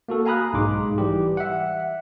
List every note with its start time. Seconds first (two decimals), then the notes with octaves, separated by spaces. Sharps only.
0.08 A#3 F#4 A4
0.25 F5 G#5 A#5 B5 D#6 F#6
0.53 B1 G#2 G#3 D#4 C6 D6
0.98 E3 G3 G4
1.37 E5 F#5